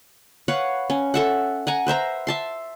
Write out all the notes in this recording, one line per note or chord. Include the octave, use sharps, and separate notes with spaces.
B4 C#5 F5 F#5
C#4
A4 E5 F#5
F#5 G#5 A#5
B4 C5 E5 A#5
E5 A5 C6